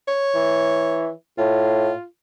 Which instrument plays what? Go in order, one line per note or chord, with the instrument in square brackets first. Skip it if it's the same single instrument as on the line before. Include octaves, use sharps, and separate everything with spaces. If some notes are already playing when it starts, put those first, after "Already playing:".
[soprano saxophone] C#5
[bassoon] E3
[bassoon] A2 [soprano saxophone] F4